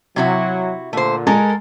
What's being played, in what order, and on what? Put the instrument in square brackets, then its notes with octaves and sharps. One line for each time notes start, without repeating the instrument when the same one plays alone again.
[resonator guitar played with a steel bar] C3 E4 F#4 [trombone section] F#3
[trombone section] A#2 D3 [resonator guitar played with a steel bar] A3 C5
[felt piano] G#3 G#5 [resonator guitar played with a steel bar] A4 A#4